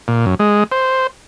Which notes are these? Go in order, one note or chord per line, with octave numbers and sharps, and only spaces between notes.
A#2
F#2
G#3
C5